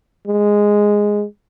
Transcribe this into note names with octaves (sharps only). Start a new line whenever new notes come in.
G#3